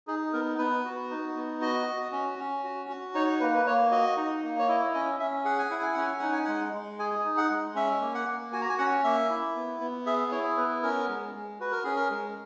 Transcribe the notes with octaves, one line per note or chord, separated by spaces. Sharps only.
D#4 G#4
B3 A#4
B3 B4
F#4
D#4
B3
F#4 D#5
F#4
C#4
C#4
F#4
F#4
D#4 C#5
A#3 B4
B4
A#3 C#5
F#4 D#5
D#4
A#3
C#5
E4 D#5
C#4 D#5
C#4 E5
G#4 F#5
G#5
E4 F#5
G#5
C#4 F#5
G#5
D#4 F#5
G#5
G#3 F#5
G#3
G#4 G#5
D#4
F#5
G#3
C#4 E5
A#3
F#5
A#3
F#4 G#5
A#5
G#5
C#4 F#5
A#3 E5
E4
B3
B3
G#4 E5
E4 C#5
B3 B4
C#4 A#4
G#3
G#3
F#4 B4
A#4
C#4 G#4
A#4
G#3